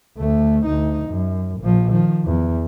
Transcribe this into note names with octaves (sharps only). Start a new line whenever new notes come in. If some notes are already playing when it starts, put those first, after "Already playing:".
D2 A3
D2 D#4
F#2
A#1 F3
D#3 F3
E2